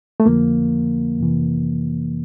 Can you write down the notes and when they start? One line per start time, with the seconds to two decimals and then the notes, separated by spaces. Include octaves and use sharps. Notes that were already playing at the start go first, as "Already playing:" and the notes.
0.20 A3
0.26 F2 D3 F3 A#3
1.20 F2 C3 E3